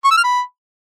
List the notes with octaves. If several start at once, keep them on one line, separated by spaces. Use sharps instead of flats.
C#6
E6
F6
B5